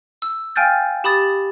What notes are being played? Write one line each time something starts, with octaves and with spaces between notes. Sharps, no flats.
E6
F5 G5 G#5 F6 G6 A6
G4 B5 D#6 A6